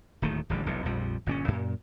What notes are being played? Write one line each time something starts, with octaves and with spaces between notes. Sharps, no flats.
D1 D#2 D#3 A3
D1 A1 D3 G3
E1 B1 C3
A#1 F2 F3 G3
G1 A#2 C4 C#4
F#2 A#2